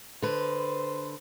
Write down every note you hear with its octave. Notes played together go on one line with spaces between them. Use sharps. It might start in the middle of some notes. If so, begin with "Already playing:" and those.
D3 B4 C5